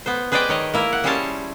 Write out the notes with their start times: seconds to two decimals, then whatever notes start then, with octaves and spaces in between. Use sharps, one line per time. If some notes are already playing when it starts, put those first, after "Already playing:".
0.06 B3 C5
0.32 G#4 B4 C5 D5 D#5 G5
0.49 D#3 C#5 D#5
0.74 A#3 E4 A#4
0.93 F#5
1.04 G3 C#4 G#4 C5 C#5 A5